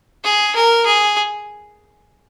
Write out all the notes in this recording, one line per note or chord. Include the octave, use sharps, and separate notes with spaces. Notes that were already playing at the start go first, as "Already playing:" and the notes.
G#4
A#4
G#4